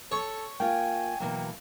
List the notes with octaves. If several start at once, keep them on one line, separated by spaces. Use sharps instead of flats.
A4 C#5
A#3 F4 G5 G#5
B2 E3 F#3 A#3